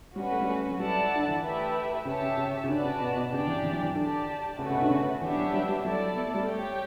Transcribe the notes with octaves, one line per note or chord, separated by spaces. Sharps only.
G3 C#4 F#4 B4
A3
G3
A3
F#3
G3 E4 A4 D5 F#5 A5
D3
E3
A3 E4 G4 B4 E5
C#3 G4 C#5 E5 A5
C#3
C#3
C#3
D3 F#4 B4 D5 A5
C#3
B2
B2
C#3 D4 G4 D5 G5
E3
E3
F#3
E3
D3 G4 D5 A5
C#3 A3 C#4 F#4 B4
C#3
B2
D3
C#3
E3 B3 D4 G4 C#5 E5
F#3
G3
G3
F#3 E4 A4 D5 A5
B3
A3
G3
A3 G4 C#5 G5